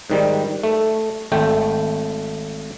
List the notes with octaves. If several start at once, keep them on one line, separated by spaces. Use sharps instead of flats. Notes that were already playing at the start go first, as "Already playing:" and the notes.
G#2 D#3 G3
A3
G#1 A3 G5